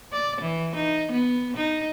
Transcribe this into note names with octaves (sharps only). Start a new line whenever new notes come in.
D5
E3
D#4
B3
D#4